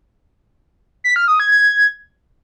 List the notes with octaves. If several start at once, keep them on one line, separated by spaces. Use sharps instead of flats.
B6
F6
D#6
G#6
G#6